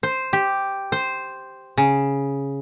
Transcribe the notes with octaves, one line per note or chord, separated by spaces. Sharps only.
C5
G4
C5
C#3